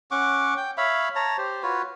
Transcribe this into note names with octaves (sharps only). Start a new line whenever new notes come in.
C#4 F#5 C#6 D6
G5
C#5 E5 F5 B5
C#5 A5 A#5
G4 C5
F4 F#4 B4 C#5